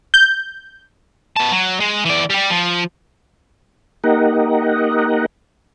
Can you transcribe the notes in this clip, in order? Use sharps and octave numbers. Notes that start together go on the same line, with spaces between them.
G6
B3 A5
F#3
G#3
E3 D5
G3 G4
F3
A#3 D#4 G4 A#4 D#5 F#5